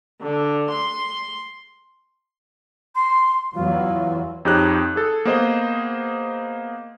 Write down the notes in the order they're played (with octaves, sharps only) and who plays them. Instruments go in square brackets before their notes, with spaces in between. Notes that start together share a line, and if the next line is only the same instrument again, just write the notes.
[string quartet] D3
C6
[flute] C6
[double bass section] E2 E3 F#3 [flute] F4
[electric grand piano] F2 D#4 G4 G#4 C#5 F#6
G#4 A4
A#3 B3 G#4 C5 D#5